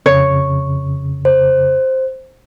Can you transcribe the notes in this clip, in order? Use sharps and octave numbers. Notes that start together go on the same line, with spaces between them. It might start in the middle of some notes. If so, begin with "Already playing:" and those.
F2 C#3 C#5
C5